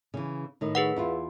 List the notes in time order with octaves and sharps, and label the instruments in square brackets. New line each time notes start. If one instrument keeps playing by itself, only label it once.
[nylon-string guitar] C#3 E3
A2 D#3
[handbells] G#4 B4 F#5
[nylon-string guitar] E2 E4 F4